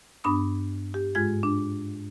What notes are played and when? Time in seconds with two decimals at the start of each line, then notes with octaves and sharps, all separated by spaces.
0.24 G2 B3 D4 B5 D#6
0.94 G4
1.15 G#2 G#3 F4 G#6
1.43 D4